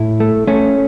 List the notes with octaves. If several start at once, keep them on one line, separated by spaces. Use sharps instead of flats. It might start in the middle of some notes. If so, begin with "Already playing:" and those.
Already playing: A2 E4
A3
A3 C#4